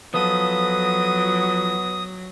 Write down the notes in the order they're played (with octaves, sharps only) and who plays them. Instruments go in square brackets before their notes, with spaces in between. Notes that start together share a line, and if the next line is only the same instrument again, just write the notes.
[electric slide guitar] F3 F4 A4 [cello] F#3 [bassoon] B3 [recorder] D#6